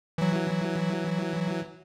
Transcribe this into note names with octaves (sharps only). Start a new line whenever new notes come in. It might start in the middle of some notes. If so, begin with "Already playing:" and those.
E3 F#3